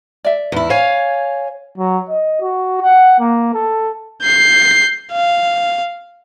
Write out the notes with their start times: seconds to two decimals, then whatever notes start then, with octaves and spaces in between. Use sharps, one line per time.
0.25 D5 E5
0.52 E2 E4
0.70 C#5 F5 G#5
1.78 F#3
2.09 D#5
2.41 F#4
2.82 F#5
3.20 A#3
3.54 A4
4.22 G6 C7
5.12 F5